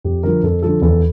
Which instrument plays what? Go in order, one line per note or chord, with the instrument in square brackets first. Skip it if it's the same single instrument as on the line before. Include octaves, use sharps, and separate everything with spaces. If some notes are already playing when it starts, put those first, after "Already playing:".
[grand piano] F2 G4
D3 F3 A#4
F2 A4
D3 F3 A4
E2 A4